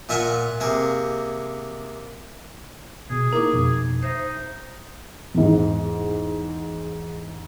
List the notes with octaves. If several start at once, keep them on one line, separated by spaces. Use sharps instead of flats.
A#2 F4 E5 F#5 G#5
C3 A#3 G#4
B2 G#4
A#3 D#4 E4 A#4 D6
F2 B2
D#4 C5 E5
E2 G#2